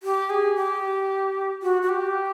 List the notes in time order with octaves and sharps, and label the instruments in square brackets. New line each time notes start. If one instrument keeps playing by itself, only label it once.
[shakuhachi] G4
G#4
G4
F#4
F#4
G4